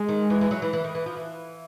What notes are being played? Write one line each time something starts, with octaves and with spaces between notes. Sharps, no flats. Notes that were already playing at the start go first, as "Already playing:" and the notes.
Already playing: G#3
D#3
E3
E3
F#3
E3
E3
D#3
E3
F3
E3